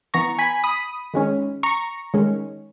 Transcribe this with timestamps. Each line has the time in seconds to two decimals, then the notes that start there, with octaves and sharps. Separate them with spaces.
0.14 E3 B3 A#5 C#6
0.39 G#5 B5
0.64 B5 D#6
1.14 D#3 G#3 C#4
1.63 A#5 C#6
2.14 D#3 G#3 C#4